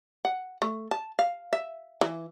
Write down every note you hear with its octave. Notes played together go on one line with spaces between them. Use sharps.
F#5
A3
A5
F5
E5
E3